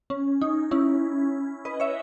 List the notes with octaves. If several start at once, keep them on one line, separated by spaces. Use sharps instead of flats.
C#4
D#4
C#4 E4
B4 D#5
C#5 E5